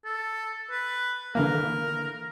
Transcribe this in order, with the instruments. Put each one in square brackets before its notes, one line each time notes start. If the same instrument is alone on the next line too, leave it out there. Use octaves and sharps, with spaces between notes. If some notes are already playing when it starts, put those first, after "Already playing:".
[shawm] A4
B4
[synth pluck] D3 E3 A#3 [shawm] A#4